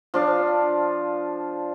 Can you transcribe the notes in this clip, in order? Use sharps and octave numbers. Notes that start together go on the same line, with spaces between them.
F3 D4 F5